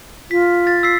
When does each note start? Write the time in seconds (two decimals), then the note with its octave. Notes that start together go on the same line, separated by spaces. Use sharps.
0.31 F4 B6
0.67 A6
0.83 E6 B6 C7